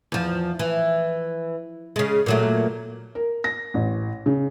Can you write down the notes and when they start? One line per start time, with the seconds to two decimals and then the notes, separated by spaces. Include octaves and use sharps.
0.12 E2 F3
0.59 E3
1.96 C#3 G#3
2.26 A#2 F#3 A3
3.15 A#4
3.44 A#6
3.74 A1
4.26 C#3